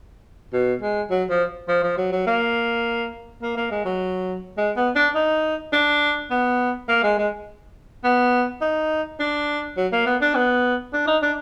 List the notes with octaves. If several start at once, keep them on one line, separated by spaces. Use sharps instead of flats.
B2
G#3
F#3
F3
F3
F3
F#3
F#3
A#3
A#3
A#3
G#3
F#3
G#3
B3
D4
D#4
D4
B3
A#3
G#3
G#3
B3
D#4
D4
F#3
A#3
B3
D4
B3
D4
D#4
D4